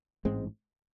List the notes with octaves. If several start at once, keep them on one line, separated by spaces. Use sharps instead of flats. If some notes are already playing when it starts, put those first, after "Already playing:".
A1 G#2 G#3 C4